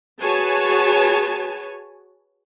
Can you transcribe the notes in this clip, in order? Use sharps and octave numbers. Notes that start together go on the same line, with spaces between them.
F#4 G#4 B4 C#5 G#5 A5